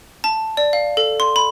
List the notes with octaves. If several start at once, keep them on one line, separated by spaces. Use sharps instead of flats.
A5
D5
F5
A4
C6
B5